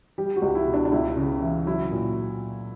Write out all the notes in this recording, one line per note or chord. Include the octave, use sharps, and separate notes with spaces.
G3 G4
F#4
C#2
E4
B2
D4
D4
C#2 E4
C#3
E3
F#3 E4
A#2